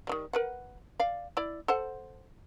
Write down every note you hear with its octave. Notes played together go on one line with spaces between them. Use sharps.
D#3 E3 G3
A#4 B4 F#5
D5 F5
E4 D5
A4 C5 F#5